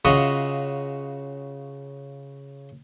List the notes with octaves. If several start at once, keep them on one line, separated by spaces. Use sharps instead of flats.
C#3 F4 F#4 D#5 E5 D#6